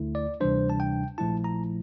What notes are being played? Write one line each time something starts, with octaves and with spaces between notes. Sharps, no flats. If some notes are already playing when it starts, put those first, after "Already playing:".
Already playing: D2 D3 A3 E4
D5
D2 C3 E3 G3 D4 C5
A5
G5
A#1 A#2 F3 A3 E4 A5
A#5